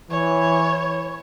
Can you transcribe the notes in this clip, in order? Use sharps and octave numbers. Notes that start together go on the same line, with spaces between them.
E3 C#5